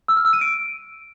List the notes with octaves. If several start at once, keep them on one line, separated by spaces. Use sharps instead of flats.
E6
F6
E6
D#7
D7